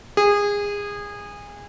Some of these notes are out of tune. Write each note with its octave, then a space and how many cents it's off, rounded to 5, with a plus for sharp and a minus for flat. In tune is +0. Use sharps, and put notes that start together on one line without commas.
G#4 -25